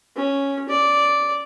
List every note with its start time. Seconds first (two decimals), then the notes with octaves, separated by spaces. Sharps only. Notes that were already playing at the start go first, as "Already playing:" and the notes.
0.16 C#4
0.69 D5